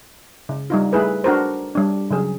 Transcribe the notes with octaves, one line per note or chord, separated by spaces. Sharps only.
C#3
G3 D#4 F4
A3 E4 G#4 B4
D4 F#4 A#4 C5
G3 D4
C#3 F#3 G#4